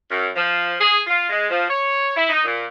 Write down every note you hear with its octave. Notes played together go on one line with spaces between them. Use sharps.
F#2
F3
G#4
F4
G#3
F3
C#5
E4
D#4
A#2